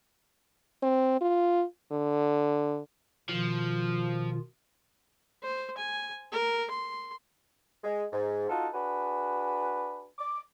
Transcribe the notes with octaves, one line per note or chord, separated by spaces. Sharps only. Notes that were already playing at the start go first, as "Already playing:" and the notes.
C4
F4
D3
B2 D#3 F3 F4
C5
G#5
A#4
C6
G#3
G#2
D#4 F4 F#4 A4
D4 F#4 G#4 B4
D6